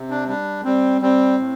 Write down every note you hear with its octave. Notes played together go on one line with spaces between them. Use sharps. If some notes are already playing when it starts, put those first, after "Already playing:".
Already playing: C3
D4
G3 D4
G3 C4
G3 C4
A2